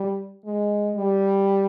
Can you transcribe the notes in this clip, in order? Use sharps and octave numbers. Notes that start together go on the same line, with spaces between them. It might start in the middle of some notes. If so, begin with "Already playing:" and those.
Already playing: G3
G#3
G3